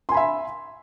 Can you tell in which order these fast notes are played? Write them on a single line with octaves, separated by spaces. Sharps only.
C6 G#5 B5 E5